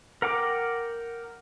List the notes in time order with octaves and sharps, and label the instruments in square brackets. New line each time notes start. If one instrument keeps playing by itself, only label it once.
[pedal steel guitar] A#4 F#5 G5 D6